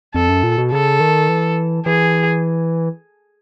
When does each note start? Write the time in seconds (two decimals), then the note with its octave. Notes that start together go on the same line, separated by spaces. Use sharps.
0.15 F2 A4
0.29 F#2
0.43 A#2
0.58 B2
0.72 C#3 A4
1.00 D#3
1.29 E3
1.86 E3 G#4